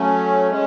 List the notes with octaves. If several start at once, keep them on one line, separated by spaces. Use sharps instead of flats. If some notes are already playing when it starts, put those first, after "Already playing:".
Already playing: F#3 A3 C#4
G#3 C#4